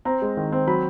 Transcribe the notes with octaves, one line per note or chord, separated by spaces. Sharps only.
C4 A#5
G#3
D#3
C4
F#3 B5